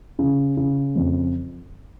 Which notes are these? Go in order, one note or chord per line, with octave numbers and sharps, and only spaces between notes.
C#3
C#3
F2